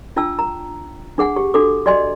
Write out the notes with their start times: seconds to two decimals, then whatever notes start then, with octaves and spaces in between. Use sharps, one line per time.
0.16 D4 F4 G5 A5 E6
0.39 A#5
1.18 D4 G#4 F#5 G#5
1.36 G4
1.54 D4 F#4 A4 D6
1.86 F#4 D5 D#5 G#5 C6